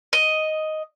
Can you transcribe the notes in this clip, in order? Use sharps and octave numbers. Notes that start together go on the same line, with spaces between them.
D#5